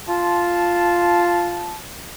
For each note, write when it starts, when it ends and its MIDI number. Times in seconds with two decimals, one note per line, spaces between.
0.08 1.77 65
0.08 1.77 81